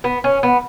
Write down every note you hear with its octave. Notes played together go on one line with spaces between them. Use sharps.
B3
C#4
B3